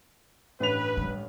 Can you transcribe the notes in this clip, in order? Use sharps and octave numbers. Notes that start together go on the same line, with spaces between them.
A1 G2 B4 F7
G3 C#4